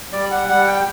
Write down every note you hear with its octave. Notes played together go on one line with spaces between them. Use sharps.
G3 D5
F#5
G3 F#5
G5